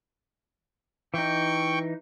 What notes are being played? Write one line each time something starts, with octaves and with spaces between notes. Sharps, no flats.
E3 D#4 G5 C#6